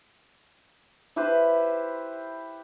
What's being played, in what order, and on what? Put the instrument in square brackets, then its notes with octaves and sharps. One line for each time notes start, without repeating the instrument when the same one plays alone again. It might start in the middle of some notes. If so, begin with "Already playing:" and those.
[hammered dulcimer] E4 G4 B4 C5